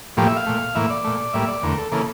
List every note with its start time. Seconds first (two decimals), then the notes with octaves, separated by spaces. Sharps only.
0.17 A2 F3 A#3 G4
0.27 E5
0.37 F5
0.47 A#2 A3
0.75 A2 E3 A#3 E5
0.90 D5
1.04 A#2 A3
1.33 A2 G3 A#3 E5
1.48 D5
1.63 E2 D3 A3 A#4
1.78 A4
1.92 C#3 E3 A#3 A4